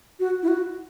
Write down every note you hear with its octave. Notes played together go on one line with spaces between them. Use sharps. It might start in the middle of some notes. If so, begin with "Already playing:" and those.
F#4
E4
F#4